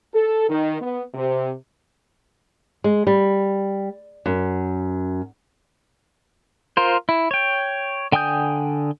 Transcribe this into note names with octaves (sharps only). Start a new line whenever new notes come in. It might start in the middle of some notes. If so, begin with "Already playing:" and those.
A4
D#3
B3
C3
G#3
G3
F#2
F4 A#4 C5
E4
C#5 G5
D3 G5 G#5 D#6 G6